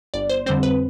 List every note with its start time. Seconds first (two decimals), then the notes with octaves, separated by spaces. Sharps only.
0.14 G1 D5
0.30 C5
0.46 F2 D3 G3 C4 C5
0.63 B4